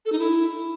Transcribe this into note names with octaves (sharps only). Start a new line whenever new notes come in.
A4
D#4
E4